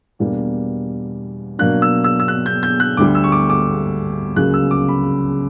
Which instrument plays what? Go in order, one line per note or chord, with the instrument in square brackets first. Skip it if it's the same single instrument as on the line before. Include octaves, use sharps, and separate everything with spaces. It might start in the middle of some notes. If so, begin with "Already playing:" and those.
[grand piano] E2 B2 G3 A#3 D4
B2 F#3 A#3 D4 F#6
E6
E6
E6
F#6
G6
G6
F#6
D2 D3 G3 D6
E6
C#6
D6
D6
C#2 C#3 F#3 A#3 F#6
E6
D6
B5